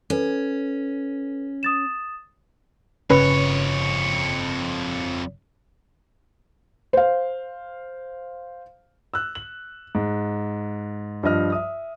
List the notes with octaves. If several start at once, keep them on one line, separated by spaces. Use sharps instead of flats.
C#4 A4 B4
D#6 A6 E7
G1 F2 C#3 C#4 B4 C#5
C5 F5
E6 F#6
F#7
G#2
G2 F3 D#5 F6
E5 D#6